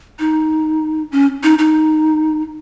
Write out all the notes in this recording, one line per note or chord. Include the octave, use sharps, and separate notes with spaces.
D#4
C#4
D#4
D#4